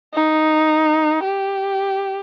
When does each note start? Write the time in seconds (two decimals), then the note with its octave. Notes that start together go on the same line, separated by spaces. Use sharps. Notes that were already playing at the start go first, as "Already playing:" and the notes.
0.14 D#4
1.24 G4